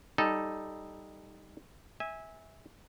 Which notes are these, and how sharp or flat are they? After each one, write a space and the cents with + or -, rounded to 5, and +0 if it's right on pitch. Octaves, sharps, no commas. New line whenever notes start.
G3 +10 D#4 +0 A4 -10
E5 -20 G#5 -15